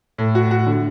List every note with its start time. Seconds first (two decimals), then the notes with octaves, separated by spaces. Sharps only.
0.18 A2
0.35 F#4
0.51 F#4
0.66 D3